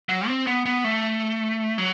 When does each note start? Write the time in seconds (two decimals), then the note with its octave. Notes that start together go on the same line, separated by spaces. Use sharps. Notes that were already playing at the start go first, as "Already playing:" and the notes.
0.09 F#3
0.28 C4
0.47 B3
0.66 B3
0.84 A3
1.78 F#3